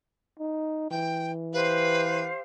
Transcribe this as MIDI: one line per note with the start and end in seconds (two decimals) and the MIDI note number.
0.40 0.90 63
0.91 2.31 52
0.91 1.31 79
1.53 2.41 67
1.53 2.25 71
1.53 2.41 72
1.53 2.41 77